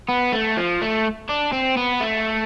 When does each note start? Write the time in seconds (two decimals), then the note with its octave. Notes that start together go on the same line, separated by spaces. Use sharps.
0.09 B3
0.32 A3
0.57 F3
0.81 A3
1.29 D4
1.53 C4
1.77 B3
2.01 A3